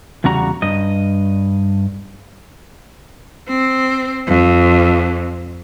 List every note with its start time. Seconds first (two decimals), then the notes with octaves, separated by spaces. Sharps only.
0.24 E2 C#3 G3 F#4 A#5
0.62 G2 D#5
3.48 C4
4.27 F2